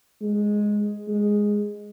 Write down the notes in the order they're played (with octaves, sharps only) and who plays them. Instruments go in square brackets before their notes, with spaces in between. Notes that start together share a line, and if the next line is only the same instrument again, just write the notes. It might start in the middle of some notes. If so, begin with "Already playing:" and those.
[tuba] G#3
G#3